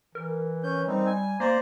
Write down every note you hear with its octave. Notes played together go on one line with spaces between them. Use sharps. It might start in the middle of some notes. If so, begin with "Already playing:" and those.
E3 A#4
C#4 G6
G3 C4 D#4
G#5
A#3 C5 D5 A#5